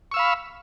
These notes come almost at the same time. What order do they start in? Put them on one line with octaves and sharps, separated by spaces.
C#6 E6 F5 B5